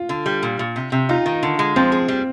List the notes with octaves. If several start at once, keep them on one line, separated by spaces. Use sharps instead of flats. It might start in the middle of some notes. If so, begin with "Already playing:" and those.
Already playing: F4
D3
G3
A#2
A#2
C3
C3
D#4 F4
D#3
D3
G#3
F3 C4
G#4
G3